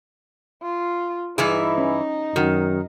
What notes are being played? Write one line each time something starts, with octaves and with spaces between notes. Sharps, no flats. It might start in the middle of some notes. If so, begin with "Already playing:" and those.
F4
G2 E3 D#4 E4 G#4
C#4
F#2 D#3 F#4 A#4